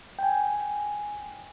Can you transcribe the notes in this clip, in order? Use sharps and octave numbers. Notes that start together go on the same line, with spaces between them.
G5 G#5